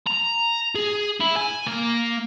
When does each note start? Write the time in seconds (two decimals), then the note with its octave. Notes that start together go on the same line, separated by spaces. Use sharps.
0.06 A#5
0.75 G#4
1.20 E4
1.36 G#5
1.66 A#3